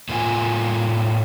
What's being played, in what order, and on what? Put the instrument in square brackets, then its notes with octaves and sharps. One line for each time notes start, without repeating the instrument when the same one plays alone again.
[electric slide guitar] A2 A3 A#3 F4 C#5 G#5